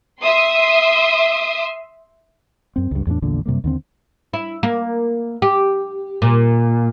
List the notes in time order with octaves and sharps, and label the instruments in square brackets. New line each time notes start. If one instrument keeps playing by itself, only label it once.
[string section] E5 C6 D#6
[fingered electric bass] F#2 C4
C#2 G2
E2 A2 F#3 D4
A#1 E2 A#2 D3
F#2 C3 G3 A#3
D#2 D3 C4
[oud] E4
A#3
G4
A#2